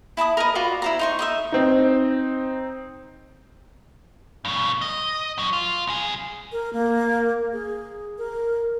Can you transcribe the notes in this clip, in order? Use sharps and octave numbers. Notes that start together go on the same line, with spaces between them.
E4 A5 B5 D#6
A#4 B4 D#5
F4 F#4 B4 D5
E4 C5 A#5
D#4 C6 C#6
D#4 D#5 E5
C4 D#4
G2 B2
D#5
F#2 F#3
F4
C2 G#4
A#4
A#3
G#4
A#4